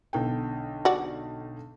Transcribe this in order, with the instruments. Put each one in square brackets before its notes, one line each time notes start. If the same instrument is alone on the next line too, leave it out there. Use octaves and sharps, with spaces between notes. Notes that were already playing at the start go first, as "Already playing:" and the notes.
[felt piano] B1 D3 G5
[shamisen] F#4 D5